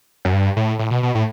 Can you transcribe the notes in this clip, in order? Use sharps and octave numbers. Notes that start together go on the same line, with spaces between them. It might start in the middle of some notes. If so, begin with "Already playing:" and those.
F#2
G2
A2
A2
B2
B2
A2